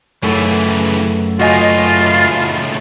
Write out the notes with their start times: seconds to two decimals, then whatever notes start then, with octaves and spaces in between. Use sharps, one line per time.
0.23 F#2 C#3 E3 A3
1.39 C#2 A2 F4 F#4 D#5 G#5